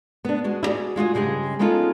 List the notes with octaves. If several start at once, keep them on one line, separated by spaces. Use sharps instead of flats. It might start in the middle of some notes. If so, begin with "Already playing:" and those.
B3 D4
G#3 F#4
E4 F#4 G#4 D5
G#3 F4 F#4 G#4
G2 C#3 G#3 G4 G#4
G#3 B3 C#4 D#4 F4 A4